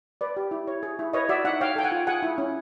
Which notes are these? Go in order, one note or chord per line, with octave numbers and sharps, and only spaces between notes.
B4 D5
G4
E4
C#5
G#4
E4
B4 C#5 D#5
F#4 D5 E5
D#4 E5 F#5
C#5 F5 G5
A4 G5
F#5 G#5
F4
G#4 F#5 G#5
E4
C#4